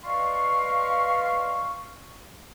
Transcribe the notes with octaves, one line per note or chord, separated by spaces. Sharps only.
B4 D5 D#5 F5 C6 C#6